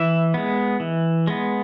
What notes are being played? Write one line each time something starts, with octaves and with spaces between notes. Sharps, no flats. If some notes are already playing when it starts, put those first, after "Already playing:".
Already playing: E3 E5
G#3 B3
E3
G#3 B3